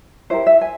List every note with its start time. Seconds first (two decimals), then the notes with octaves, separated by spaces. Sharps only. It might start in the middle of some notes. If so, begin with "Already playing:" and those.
0.30 E4 G4 A#4 C5
0.46 E5
0.61 G#5